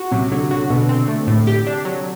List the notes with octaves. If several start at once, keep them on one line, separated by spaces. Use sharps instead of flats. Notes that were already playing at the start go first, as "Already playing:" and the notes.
Already playing: F#4
C3 F#3
D3 F#3
D3 F#4
B2 D3
C4
A3
A2
G4
D4
F#3